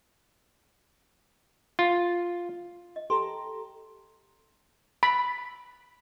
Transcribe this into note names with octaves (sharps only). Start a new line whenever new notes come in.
F4
D#5
G4 A4 A#5 C6
B5